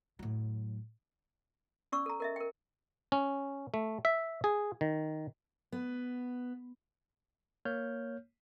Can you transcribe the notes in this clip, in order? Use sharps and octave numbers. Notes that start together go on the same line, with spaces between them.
A2 F#3
C#4 D5 C#6 E6
A4 A#5
A#4 D#5 E5
A#4 G5
C#4
A3
E5
G#4
D#3
B3
A#3 C#5 F6 G6